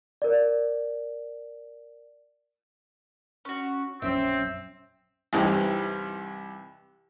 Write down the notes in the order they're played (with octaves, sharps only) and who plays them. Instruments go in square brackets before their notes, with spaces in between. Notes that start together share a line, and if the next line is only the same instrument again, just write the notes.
[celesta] A#4 D5
[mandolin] C#4 F#4
[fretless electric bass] A#1 F#2 C#4 [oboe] C4 [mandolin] E5
[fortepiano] C2 G2 C3 E3 D#4 G5